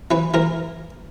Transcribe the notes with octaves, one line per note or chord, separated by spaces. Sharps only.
E3 B4
E3 A#4